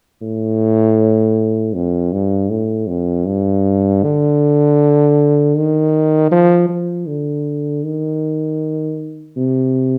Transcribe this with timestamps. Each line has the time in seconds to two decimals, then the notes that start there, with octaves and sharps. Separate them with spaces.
0.22 A2
1.74 F2
2.12 G2
2.50 A2
2.88 F2
3.26 G2
4.03 D3
5.55 D#3
6.31 F3
6.69 F3
7.08 D3
7.83 D#3
9.37 C3